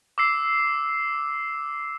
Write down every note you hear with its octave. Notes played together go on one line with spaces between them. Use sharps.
D6 E6 C7